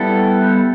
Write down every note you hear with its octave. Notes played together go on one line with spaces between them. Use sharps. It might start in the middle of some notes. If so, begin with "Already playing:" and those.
Already playing: G3 B3 E4 A4